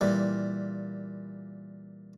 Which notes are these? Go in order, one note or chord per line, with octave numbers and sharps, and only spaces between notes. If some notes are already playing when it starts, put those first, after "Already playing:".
A#2 E3 G3